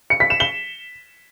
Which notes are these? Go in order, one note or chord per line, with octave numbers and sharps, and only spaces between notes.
C#7
B6
E7
G7